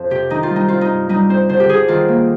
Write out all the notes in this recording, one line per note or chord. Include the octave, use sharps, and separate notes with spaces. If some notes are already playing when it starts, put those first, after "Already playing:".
Already playing: F2 C5
C3 G4
D#3 D#4
F4
G3
D#4
C4 F4
D#4
G2
G3 D#4
C4 C5
D3 C5
G4
D3 G#4
D#3 F4
A#3